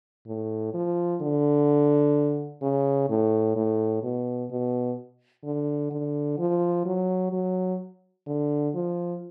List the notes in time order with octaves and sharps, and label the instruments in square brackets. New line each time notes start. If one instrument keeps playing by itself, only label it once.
[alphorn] A2
F3
D3
C#3
A2
A2
B2
B2
D3
D3
F3
F#3
F#3
D3
F3